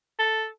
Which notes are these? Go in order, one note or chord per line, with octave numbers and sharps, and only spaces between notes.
A4